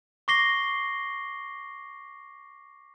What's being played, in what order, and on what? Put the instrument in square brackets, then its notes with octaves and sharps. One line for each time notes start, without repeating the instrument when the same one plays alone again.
[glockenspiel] C#6 D6 A#6 C7 G7